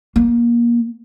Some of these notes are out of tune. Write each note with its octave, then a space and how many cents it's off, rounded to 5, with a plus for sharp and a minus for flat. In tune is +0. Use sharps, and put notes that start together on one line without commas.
A#3 +20